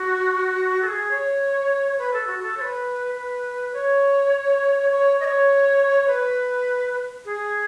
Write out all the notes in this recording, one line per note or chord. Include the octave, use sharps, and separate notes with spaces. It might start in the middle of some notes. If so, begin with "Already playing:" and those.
Already playing: F#4
A4
G#4
C#5
B4
A4
F#4
A4
C#5
B4
B4
C#5
C#5
D#5
C#5
B4
G#4